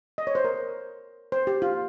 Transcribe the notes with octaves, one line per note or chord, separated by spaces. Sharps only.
D#5
C#5
C5
A#4
C5
G4
F4